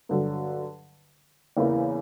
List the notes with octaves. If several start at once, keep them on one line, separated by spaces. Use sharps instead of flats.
G2 D3 F#3
E2 C#3 E3 A#3 E4